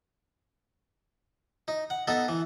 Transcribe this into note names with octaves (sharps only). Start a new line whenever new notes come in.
D#4
F#5
B3 D#4 A4
E3